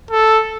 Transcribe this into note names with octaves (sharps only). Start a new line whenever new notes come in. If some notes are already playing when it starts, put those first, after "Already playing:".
A4